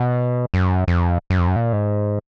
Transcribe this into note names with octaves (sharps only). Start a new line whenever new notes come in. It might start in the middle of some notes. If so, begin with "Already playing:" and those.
Already playing: B2
F#2
F2
F#2
F2
F#2
A#2
G#2